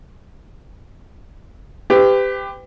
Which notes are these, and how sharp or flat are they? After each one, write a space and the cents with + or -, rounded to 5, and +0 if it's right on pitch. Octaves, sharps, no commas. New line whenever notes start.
G4 +15 B4 +40